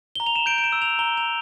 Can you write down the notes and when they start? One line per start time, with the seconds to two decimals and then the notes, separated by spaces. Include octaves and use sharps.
0.15 A#5 G7
0.26 F7
0.36 E7
0.46 G6 D7
0.58 D7
0.64 E7
0.72 E6
0.82 F7
0.99 A#5 G7
1.17 F7
1.26 A#5